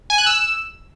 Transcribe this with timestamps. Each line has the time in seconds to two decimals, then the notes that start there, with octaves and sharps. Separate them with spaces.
0.10 G#5
0.18 F#6
0.26 E6